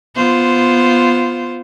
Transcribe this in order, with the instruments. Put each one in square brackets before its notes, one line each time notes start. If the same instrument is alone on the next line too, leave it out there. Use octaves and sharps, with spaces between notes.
[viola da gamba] B3 F4 C5